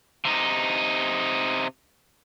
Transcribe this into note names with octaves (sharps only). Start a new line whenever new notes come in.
C3 D#4